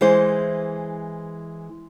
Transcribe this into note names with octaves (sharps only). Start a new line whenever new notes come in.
E3 G#3 C5